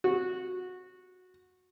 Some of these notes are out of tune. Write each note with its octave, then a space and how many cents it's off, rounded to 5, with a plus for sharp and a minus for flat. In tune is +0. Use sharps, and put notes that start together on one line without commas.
F#4 -15